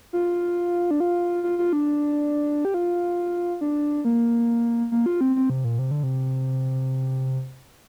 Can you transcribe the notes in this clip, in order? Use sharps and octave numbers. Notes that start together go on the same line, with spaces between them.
F4
D4
F4
F4
F4
D4
G4
F4
D4
A#3
A#3
F4
C4
C4
C3
A#2
C3
D3
C3